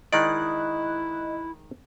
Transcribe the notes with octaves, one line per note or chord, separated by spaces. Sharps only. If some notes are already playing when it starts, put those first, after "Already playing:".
D#3 G#3 E4 D5 D#5 F#6